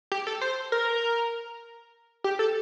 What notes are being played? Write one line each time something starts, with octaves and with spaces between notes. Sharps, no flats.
G4
A4
C5
A#4
G4
A4